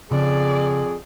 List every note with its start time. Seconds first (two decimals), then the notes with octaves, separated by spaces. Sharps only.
0.11 F2 C#3 G#4 D5